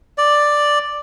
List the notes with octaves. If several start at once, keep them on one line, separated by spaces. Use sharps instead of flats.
D5